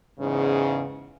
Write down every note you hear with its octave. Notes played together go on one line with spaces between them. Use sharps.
E2 G#2 C#3